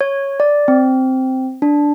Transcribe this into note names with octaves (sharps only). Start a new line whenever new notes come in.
C#5
D5
C4
D4